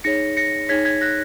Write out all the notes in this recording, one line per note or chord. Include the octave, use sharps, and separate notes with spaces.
D#4 G#4 C#5 A#6 C#7
A#6 C#7
D#4 G#4 C#5 G#6 B6
G#6 B6
F#6 A#6